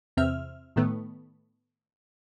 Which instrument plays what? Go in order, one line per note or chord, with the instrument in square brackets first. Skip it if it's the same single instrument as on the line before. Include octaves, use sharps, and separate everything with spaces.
[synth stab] E2 C3 C4 E5 F6
A2 D#3 A3 B3